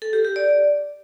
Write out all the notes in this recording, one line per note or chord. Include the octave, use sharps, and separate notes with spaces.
A4
G4
G4
D5